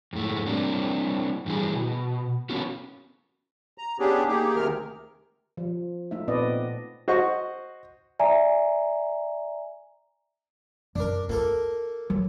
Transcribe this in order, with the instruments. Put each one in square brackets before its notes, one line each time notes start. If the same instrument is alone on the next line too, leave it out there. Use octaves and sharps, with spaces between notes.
[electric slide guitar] F2 G#2 A3
G3 A#3 C4 D4
G2 E3 G3 G#4
B2
A#3 B3 C#4 F4 F#4
[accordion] A#5
B3 C#4 D4 G4 G#4
A#3 D#4 G4 G#4
D2 C3 D#3 G#3 A#4 F6
[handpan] F3
A3 D#4 F4 E5
A#2 B3 C4 B4 D5 D#5
[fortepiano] F#4 C5 D#5 F#5 C#6
[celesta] D5 E5 G#5 A#5
[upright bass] F#2 [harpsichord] D4 A#4
[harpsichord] A#3 A4 A#4 [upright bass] F4
[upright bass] F#3